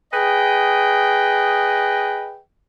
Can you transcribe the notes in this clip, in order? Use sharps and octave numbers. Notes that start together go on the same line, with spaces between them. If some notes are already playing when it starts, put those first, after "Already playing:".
G#4 B4 D#5 G5